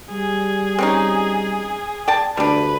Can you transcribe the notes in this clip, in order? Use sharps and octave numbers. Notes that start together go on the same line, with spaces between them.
G3 G#4
C4 C#4 D#4
D5 G5 A5
D2 G3 D4 B4